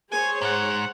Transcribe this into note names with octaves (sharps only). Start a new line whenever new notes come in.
G#4 C5 C#5 G#5
G#2 F#5